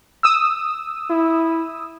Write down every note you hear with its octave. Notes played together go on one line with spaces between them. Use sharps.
D#6 E6
E4